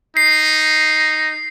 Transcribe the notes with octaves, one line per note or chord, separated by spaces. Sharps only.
D#4 C7